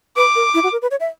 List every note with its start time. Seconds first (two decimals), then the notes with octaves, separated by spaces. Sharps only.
0.16 B4 D6
0.36 A#4
0.54 E4
0.63 F#4
0.72 A#4
0.82 B4
0.91 C#5
1.00 E5